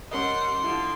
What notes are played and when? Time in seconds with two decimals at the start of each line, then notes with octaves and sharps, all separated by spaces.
0.11 G3 C#4 A#4 D#5 F#5 C6
0.64 D3 F3 E4